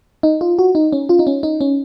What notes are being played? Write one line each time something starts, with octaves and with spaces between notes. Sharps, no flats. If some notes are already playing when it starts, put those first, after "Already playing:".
D#4
F4
F#4
D#4
C#4
F4
D#4
C#4
D#4
C#4